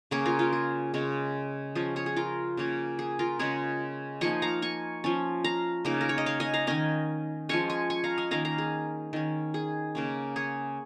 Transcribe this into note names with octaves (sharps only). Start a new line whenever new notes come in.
C#3 A#3 C#4 G#4 C#5
F4 A#4
F4
G#4
C#3 G#3 C#4
F3 C#4 G#4
G#4 C#5
G#4
F4 A#4
C#3 A#3 C#4
G#4
F4 A#4
C#3 G#3 C#4 G#4 C#5
F3 A#3 D#4 G#5 C#6
F5 A#5
G#5 C#6
F3 C#4
F5 A#5
C#3 A#3 D#4
A#4
C#5
D#5
C#5 F5
D#5 G#5
F5 A#5
D#3 C#4 D#5 G#5
F3 G#3 C#4 G#5 C#6
G#5 C#6
G#5 C#6
F5 A#5
D#5 G#5
D#3 A#3 C#4 F5 A#5
F5 A#5
G#4
D#3 C#4
G#4
C#3 A#3 C#4
G#4 C#5